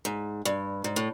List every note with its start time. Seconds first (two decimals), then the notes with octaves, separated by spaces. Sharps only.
0.05 G#2
0.45 G2
0.84 G#2
0.96 A2